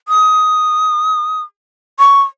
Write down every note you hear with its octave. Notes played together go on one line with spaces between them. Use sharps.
D#6
C#6